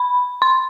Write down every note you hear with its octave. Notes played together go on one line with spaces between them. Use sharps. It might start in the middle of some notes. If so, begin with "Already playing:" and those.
Already playing: B5
C6